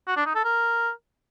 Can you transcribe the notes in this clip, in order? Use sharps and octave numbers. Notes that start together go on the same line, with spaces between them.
F#4
D4
D#4
A4
A#4